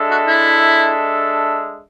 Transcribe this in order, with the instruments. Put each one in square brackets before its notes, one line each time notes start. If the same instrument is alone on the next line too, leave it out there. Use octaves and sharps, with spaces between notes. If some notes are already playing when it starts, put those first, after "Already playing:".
Already playing: [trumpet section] G#3 D4 A4 E5
[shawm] F#4
E4